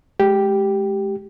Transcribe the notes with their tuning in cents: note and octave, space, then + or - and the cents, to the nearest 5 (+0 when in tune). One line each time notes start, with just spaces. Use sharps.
G#3 +30 G4 +0